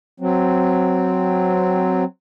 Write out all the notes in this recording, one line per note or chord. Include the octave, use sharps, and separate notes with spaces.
F#3 C4